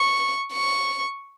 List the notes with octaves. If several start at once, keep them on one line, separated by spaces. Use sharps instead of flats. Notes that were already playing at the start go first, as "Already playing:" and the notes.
Already playing: C#6
C#6